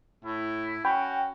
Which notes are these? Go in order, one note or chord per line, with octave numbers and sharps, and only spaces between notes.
A2 E4
C#4 F#4 G5 B5